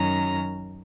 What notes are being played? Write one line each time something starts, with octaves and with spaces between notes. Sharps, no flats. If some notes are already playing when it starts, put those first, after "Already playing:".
Already playing: F#2 D#3 F#3 C#4 A#5